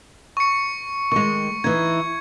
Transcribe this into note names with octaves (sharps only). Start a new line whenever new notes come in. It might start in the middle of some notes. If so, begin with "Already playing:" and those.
C#6 C#7
D#3 G#3 C#6
E3 D#4 G#6